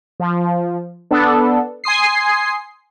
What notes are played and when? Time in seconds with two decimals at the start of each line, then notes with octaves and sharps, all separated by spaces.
0.20 F3
1.11 B3 D4 A4
1.84 G#5 C6 D#6 C7